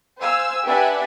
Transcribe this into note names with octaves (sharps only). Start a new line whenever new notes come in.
C5 F5 G#5 E6
D4 G4 B4 E5 F#5 G#5